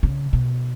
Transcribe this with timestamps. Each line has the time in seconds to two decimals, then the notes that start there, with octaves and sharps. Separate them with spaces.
0.03 C#3
0.33 B2